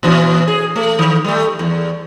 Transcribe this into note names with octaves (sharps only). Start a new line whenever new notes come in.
A#2 E3 C#4
G#4
A3
D#3
G3 A3
E2